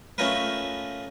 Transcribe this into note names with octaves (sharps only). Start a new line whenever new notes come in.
A3 C#4 D#4 F4 A#4 B4